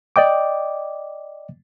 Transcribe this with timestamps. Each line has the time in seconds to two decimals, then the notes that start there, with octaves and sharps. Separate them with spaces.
0.16 D5 D#5 G5 D6